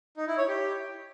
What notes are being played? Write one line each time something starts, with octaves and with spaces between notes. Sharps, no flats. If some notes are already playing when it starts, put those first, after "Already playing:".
D#4
E4
C#5
G4